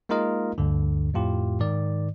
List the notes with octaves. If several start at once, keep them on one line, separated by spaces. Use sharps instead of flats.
G#3 A#3 D#4 F4 A#4 D#5
D2 G2 D3
F2 A2 F4 G4
G#2 D#3 D5